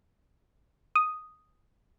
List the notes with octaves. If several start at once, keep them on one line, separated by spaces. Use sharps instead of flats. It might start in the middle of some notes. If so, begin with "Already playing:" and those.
D#6